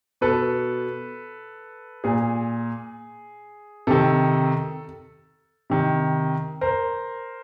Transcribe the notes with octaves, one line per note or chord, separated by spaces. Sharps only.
B2 A4 B4
A#2 G#4
C3 D#3 A4
C3 D#3
A#4 C5